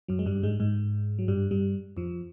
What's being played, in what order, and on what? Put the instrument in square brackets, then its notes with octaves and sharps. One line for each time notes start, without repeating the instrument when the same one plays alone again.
[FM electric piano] F#2 F#3
G#3
G2 G3
G#2 G#3
G#2 G#3
F#3
G2 G3
G2 G3
F2 F3